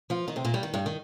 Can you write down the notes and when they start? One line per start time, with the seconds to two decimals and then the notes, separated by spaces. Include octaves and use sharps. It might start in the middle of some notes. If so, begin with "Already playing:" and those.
0.10 F3 F4
0.28 D#3 D#4
0.36 C3 C4
0.44 A#2 A#3
0.54 G2 G3
0.63 D#3
0.74 G2 G3
0.86 D#3